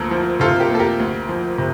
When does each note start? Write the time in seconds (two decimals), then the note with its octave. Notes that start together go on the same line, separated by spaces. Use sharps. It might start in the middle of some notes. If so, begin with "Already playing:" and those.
Already playing: D2 F3 A#3 A4 A#4
0.11 F3
0.40 C3 F4 A4
0.60 G4 A#4
0.70 A#3 A4
0.79 G4 A#4
1.00 D2
1.29 F3
1.58 C3